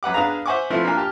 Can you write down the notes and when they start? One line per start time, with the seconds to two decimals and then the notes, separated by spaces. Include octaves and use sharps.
0.03 F#2 B4 F#5 D6
0.14 B3 D4 G#4 F5 A#5
0.46 C5 E5 F#5 G#5 C#6 D6
0.70 F3 A3 B3 C4 E4
0.84 A#3 D4 F4 A#4 G#5
0.97 G4 A5 F6